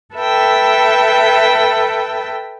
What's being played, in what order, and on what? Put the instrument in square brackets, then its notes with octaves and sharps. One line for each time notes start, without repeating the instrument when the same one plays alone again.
[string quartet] A4 B4 E5 G5